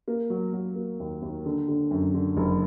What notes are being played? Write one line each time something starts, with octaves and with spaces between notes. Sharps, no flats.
A#3
F#3
F#3
A#3
D#2
D#2
D3
D3
F#2
D3
F#1